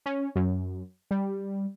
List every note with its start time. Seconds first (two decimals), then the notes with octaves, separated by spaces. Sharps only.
0.06 C#4
0.36 F#2
1.11 G3